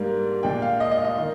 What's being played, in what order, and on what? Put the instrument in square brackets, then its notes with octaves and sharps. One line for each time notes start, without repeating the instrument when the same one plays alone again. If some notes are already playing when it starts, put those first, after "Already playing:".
Already playing: [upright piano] G#2 G3 A#3 D4
A#2 G#3 D4 G5
F5
D#5
D#5
D#5
D#3